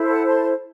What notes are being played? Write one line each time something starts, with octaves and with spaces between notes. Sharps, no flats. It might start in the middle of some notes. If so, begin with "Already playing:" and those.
Already playing: E4 A4 C5
F#5 A5
A5 C6